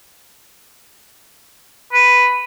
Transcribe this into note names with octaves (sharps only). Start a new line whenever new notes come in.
B4